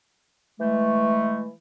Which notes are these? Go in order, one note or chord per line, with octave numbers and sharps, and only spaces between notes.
E3 G#3 A3